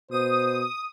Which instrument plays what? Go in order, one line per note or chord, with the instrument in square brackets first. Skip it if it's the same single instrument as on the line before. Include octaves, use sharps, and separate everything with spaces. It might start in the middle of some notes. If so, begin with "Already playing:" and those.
[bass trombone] B2 [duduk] C5 [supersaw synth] D#6